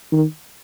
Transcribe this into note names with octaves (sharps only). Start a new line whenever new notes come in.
D#3